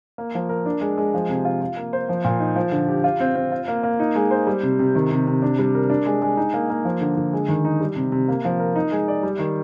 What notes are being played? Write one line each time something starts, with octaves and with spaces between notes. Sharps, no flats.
A#3
F3
A#4
D4
G#3
G#3
F3
C3
F4
F4
A#3
C5
F3
A#2
D#4
F3
D3
G4
F4
C4
C4
F4
A#3
A#3
D#4
G#3
C5
G3
C3
C3
D#3
C3
C3
D4
G3
A#4
D4
G#3
G#3
D#4
A#3
A#3
F3
D3
D3
G#3
D#3
D#4
G3
C3
C3
A#3
F3
A#4
D#4
G#3
D5
G3
D#3